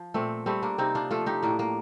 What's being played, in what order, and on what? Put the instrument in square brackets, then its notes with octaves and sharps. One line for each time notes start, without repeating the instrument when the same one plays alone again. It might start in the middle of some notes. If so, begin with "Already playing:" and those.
Already playing: [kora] F3
A#2 A3 C4
G3 A3 C4
A#3 D4
C3 C4 D#4
D4 F4
F3 A3 F4 A4
D#4 G4
A2 A#3 D4
A#3